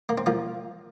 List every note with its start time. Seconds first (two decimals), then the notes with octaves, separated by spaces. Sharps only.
0.09 A#3
0.18 C4
0.26 F3 A#3